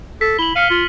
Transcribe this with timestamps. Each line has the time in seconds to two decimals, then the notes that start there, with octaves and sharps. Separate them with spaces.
0.21 A4 B6
0.39 E4 F#7 G7
0.56 F5 F6 C#7 D#7
0.70 F4